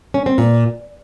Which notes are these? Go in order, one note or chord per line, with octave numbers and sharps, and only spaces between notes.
C#4
C4
A#2